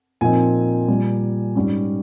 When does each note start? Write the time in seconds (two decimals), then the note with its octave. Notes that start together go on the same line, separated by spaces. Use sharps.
0.21 A#2 F3 C4 D#4 G#5
0.88 A#2 G3 A#3
1.55 G#2 G3 C#4